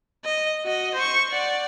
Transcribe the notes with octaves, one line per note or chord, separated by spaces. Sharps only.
D#5
F#4 D#5
C5 C#6
D5 F#5